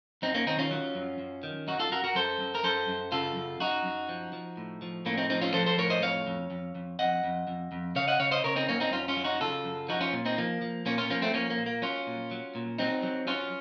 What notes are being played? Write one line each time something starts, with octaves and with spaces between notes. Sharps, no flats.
F#2 C4 D#4
A#3 C#4
D#3 C4 D#4
C#4 F4
F#3
F#2
F#2
D#3
F#2 D#4 F#4
F4 A4
F#2 F#4 A#4
F#4 A#4
F#2 A4 C5
F#2
A#4
F#2 A4 C5
F#2
C#3 F4 A4
F#2
F#2 D#4 F#4
F#2
F3
F3
A2
F3
A2 A#3 C#4
C4 D#4
F3 C4 D#4
C#4 F4
F3 A4 C5
A4 C5
A2 A#4 C#5
C5 D#5
F2 C#5 F5
F2
F2
F2
F2 D#5 F#5
F2
F2
F2
C#3 C#5 F5
D#5 F#5
C#3 C#5 F5
C5 D#5
C#3 A#4 C#5
C4 D#4
F#2 A#3 C#4
C4 D#4
F#2 C#4 F4
C#4 F4
F#3
D#4 F#4
C#3 F4 A4
F#2
F3 D#4 F#4
C#4 F4
A#2
C4 D#4
F3 A#3
F3
A#2 A#3 C#4
C#4 F4
F3 A#3 C#4
A3 C4
F3 A#3 C#4
A#3
A#2
A#3
F#3 C#4 F4
A#2
F#3
A#2
F#3 C4 D#4
F#3
F#3 C#4 F4